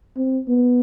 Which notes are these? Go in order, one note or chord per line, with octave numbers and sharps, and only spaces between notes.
C4
B3